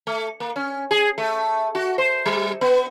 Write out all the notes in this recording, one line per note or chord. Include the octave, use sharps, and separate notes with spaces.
A3
A#3
C#4
G#4
A3
F#4
C5
G3
B3